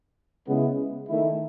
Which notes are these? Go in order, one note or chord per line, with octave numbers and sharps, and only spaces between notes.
C#3 G#3 B3 E4
D#3 A3 E4